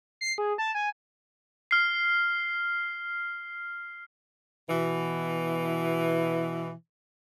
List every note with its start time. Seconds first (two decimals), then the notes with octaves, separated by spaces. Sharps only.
0.21 C7
0.38 G#4
0.58 A5
0.75 G#5
1.71 F6 C7
4.70 B2 E3